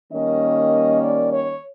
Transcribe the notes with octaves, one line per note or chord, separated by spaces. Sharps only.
D#3 G3 A#3 C#4 D#5
D5
C#5